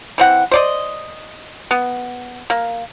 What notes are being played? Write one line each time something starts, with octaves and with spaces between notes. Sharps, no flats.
E3 C4 F#5
C5 D5 D#5
B3
A#3